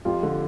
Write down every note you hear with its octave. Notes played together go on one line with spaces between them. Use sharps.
F2 F4 G4
D3